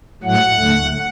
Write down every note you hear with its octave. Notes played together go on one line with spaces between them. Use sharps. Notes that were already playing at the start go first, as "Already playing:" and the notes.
A2 F#3 A3 F#5
D2 D3 A3